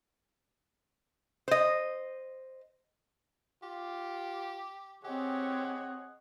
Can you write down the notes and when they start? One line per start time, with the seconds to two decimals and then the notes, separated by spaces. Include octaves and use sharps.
1.48 C5 D#5
3.63 F4 G4
5.04 C4 G4 G#4 C#5 D#5 F#5